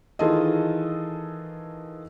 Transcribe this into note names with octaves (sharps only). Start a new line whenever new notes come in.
D#3 E3 F4 G#4 A4 D#5